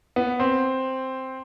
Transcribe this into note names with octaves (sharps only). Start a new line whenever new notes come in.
B3
C4